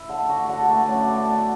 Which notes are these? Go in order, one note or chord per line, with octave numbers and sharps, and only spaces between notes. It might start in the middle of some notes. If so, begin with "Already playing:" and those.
Already playing: E4
D3
D3 F#4
D3 F#4
A4
A3 B4
F#2 D5
D3 D5
B3 E5